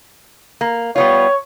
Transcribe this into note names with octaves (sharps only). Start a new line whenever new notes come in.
A#3
G3 B3 F4 C#5